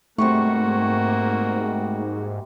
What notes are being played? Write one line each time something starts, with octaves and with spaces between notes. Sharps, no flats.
G#2 C3 G3 A3 A#3 F#4 C#6